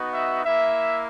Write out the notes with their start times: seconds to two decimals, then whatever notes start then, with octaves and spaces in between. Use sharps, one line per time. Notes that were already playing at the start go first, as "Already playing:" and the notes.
Already playing: B3 D#4 F#4
0.14 E5
0.43 A#3 E4 E5